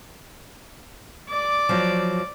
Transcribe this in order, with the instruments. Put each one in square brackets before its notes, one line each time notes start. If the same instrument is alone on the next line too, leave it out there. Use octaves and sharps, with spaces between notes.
[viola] D5 D6
[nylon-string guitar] F3 F#3